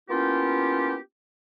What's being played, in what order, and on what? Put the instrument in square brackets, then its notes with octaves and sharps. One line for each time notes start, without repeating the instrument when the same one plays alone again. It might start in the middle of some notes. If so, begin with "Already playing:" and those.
[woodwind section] A#3 B3 C#4 E4 F4 G4